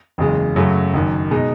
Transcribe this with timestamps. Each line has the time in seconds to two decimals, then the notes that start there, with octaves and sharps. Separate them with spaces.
0.18 F#1 E2 C#3 G#3
0.56 F#2 C#3 F#3 A3
0.94 F#1 F#2 D#3
1.31 B2 G#3 D#4